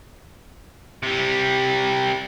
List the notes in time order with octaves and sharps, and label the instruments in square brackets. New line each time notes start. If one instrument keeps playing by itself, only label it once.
[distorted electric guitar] C3 G3